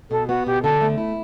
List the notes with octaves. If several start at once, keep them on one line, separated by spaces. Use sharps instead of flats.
B2 A4
B3 F#4
B2 G4
D3 A4
A3
E4